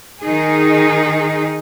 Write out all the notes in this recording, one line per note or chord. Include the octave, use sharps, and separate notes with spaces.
D#3 D#4 G#4